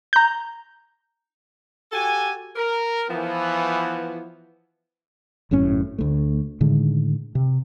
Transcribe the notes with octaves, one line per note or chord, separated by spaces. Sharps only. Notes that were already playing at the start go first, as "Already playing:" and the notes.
A#5 G6
F#4 G4 A4 G#5
A#4
E3 F3 B3
G#1 F#2 A2 C#4
D2 A3
A2 D3 D#3 G#3
C3